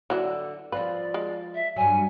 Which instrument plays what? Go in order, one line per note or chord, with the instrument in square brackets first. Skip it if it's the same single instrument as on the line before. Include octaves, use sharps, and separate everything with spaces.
[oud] D3 [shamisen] E3 F#3 D4
[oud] F3 C4 F4 [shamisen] B4 [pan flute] D5
[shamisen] G#3
[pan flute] E5
[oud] G2 F#3 [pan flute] G#5